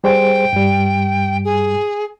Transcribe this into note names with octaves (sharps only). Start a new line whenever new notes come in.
G3 G#4 C5 G5
G2 G3
G#4